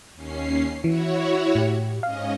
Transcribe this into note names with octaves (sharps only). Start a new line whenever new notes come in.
D#2 C#4 C7
E3 E4 F#4 C#5
A2 G4
G#2 C#4 D#5 F5